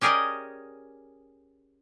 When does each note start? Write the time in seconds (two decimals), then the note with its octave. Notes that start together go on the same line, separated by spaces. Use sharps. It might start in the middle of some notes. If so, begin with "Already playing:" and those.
0.01 C#4 G4 G#4 A#4 D5 D#5